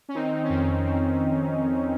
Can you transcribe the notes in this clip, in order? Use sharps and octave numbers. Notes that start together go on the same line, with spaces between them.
C#4
D#3 C4 D#4
D#3
C#4
F2 C4 D#4
D#3
D#3 C4